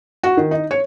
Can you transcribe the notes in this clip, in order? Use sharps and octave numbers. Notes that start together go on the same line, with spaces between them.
F#4
D#3
D#4
C#5